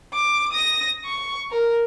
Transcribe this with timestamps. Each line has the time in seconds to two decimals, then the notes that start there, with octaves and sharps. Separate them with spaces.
0.14 D6
0.53 D#6 A#6
1.05 C#6
1.51 A#4